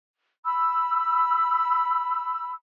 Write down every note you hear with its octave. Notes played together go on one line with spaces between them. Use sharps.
B5 E6